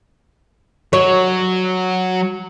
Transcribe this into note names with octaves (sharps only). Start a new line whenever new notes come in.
F#3 C#5